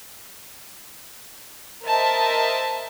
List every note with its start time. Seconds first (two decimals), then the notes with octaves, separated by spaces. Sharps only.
1.86 A#4 C5 D#5 E5 A5